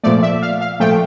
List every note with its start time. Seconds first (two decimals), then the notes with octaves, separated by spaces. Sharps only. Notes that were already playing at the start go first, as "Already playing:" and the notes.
0.04 A#2 F3 A3 D5
0.22 E5
0.42 F5
0.61 F5
0.80 A#2 F3 A3 G5